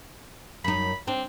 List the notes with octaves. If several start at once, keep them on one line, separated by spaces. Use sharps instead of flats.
F#2 D#4 B5
C4 D4